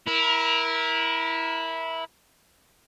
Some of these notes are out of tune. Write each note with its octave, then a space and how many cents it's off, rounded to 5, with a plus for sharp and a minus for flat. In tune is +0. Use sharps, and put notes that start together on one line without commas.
E4 -10 A#4 +20